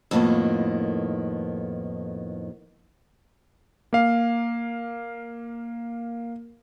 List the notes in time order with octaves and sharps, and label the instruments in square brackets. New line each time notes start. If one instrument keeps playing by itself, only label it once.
[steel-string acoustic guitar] F2 A2 D#3 A#3 B3
[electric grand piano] A#3 F5